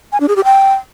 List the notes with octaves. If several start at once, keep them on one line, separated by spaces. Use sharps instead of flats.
G#5
D4
G#4
G4
G5